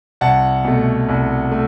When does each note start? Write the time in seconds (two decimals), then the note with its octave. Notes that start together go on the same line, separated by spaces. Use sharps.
0.21 C2 F#5 A5
0.65 B2 A3
1.09 C2
1.52 A3